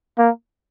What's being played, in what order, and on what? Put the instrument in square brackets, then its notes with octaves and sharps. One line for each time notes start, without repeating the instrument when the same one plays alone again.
[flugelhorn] A#3